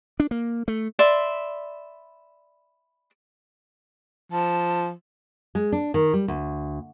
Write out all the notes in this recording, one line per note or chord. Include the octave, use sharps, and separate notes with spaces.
D4
A#3
A3
D5 E5 B5 C6
F3 A5
G#3
D4
D#3
G3
D2